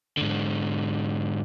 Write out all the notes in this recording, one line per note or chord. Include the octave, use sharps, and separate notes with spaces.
G#2 D3